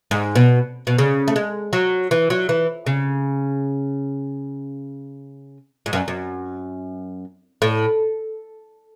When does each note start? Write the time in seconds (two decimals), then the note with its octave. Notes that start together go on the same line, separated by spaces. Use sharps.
0.11 G#2
0.36 B2
0.87 B2
0.98 C#3
1.28 A3
1.36 G#3
1.73 F#3
2.11 E3
2.30 F#3
2.49 E3
2.86 C#3
5.86 G#2
5.93 F#2
6.08 F#2
7.62 A2